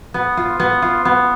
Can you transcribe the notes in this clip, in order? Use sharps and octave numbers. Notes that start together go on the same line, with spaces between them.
B3
F4
B3
F4
B3